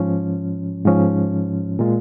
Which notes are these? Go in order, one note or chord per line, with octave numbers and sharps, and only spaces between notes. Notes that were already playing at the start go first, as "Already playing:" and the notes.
Already playing: G#2 F3 C#4
G#2 F3 C#4
A#2 G#3 F4